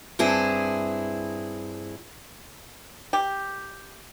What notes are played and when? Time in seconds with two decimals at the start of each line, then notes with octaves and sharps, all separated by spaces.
0.19 G2 C4 E4 G#4
3.13 G4